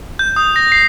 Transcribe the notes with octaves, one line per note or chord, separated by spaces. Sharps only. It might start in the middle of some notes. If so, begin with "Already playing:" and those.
G6
D#6
A#6
C7